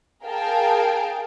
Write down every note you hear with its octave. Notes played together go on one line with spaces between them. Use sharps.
G#4 A#4 F5 G5 A5